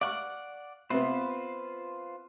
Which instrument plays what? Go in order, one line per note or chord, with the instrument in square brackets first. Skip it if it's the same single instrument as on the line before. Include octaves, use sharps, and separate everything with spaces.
[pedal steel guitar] D5 F#5 [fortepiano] F5 C#6
[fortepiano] C3 B3 [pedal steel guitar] F4 B4 C5